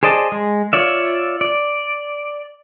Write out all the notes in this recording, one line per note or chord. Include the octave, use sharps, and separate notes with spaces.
G#4 C5 D5 D#5 A5
G#3
F4 C#5 D5 E5
D5